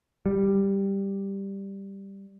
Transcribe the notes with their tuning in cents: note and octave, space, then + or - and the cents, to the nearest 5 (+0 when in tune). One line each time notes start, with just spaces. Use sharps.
G3 +5